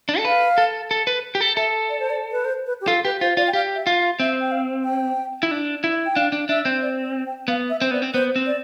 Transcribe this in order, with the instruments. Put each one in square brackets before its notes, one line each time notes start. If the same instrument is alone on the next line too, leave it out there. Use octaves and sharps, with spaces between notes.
[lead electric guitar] D4
A4
[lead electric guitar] B4 [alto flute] F5
[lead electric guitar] A4
A4
B4
G4
A4
[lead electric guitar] A4 [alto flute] E5
[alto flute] D5
C5
D5
B4
C5
B4
G4
[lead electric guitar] F4 [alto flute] A4
[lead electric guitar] G4 [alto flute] B4
[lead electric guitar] F4 [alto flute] C5
[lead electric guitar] F4 [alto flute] D5
[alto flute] G5
[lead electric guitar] G4 [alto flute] F5
[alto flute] E5
[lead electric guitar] F4
[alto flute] F5
[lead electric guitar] C4 [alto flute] E5
[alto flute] G5
F5
G5
[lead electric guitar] E4
D4
E4
[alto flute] G5
[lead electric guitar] D4 [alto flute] F5
[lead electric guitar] D4
[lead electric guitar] D4 [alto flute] E5
[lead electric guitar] C4
[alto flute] D5
C5
G5
[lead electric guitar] B3 [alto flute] F5
[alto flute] E5
[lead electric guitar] C4 [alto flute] C5
[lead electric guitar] B3 [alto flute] D5
[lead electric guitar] C4
[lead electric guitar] B3 [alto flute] C5
[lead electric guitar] C4
[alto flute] D5